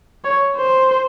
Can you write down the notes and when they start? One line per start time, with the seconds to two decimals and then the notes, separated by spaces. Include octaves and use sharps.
0.25 C#5
0.57 C5